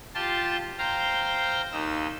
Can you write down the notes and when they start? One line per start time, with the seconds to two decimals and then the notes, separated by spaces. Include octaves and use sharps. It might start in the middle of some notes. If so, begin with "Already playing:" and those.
0.15 F4 G4 A5 C6
0.78 C5 F5 G5 A#5
1.72 D#2 D#4 E6